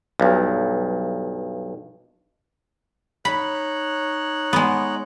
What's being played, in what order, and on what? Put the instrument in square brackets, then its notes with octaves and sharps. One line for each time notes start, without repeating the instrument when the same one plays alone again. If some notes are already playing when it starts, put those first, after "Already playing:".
[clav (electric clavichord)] B1 G2
[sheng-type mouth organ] D#4 C#5 F#6 [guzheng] B5
[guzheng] G#3 B3